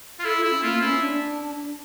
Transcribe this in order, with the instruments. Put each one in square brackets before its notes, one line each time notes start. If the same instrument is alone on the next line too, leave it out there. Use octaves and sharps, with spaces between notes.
[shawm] F4
[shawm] E4 [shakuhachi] A4
[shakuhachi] F4
[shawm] E4
[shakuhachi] C#4
[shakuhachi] A#3 [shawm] F4
[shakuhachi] A#3
[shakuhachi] C#4 [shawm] E4
[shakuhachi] D4